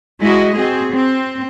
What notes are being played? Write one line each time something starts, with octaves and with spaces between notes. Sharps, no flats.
G#3 E4 F#4 D#5
C4 F#4 G#4
C4